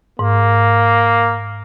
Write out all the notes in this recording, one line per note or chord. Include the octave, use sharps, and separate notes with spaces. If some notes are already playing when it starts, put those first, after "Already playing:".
G#2 A#3